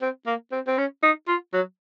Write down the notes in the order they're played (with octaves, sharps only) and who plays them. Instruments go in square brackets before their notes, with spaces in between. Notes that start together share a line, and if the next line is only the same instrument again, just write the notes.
[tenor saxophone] C4
A#3
C4
C4
C#4
D#4
F4
F#3